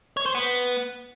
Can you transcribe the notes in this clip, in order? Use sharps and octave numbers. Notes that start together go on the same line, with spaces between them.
C#5
C5
B3